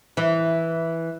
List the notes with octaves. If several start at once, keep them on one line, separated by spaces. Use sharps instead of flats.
E3